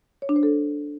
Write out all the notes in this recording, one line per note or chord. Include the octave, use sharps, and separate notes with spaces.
C#5
D4
C5
A4